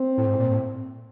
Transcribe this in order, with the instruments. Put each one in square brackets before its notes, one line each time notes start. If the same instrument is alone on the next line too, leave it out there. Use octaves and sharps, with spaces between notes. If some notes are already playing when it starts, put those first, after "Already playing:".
Already playing: [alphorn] C4
[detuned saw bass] A2
G#2
A#2
A2